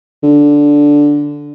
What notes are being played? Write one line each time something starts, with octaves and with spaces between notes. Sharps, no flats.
D3